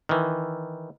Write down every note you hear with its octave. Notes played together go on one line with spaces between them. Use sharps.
D#3 E3